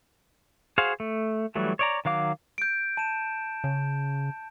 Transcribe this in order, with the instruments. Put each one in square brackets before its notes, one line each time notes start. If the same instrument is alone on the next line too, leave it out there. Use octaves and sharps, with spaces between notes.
[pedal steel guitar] F#4 G#4 C5 F5
A3
E3 F#3 G3 A3
C#5 D5 A#5
D#3 F#3 F5 D6
[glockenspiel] G6 D7
A5 E7
[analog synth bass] C#3